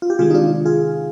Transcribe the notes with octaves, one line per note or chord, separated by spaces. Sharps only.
F4
G4
C3 D#3 G#3 F4 G#4
D#4
D4 F4
F4 G#4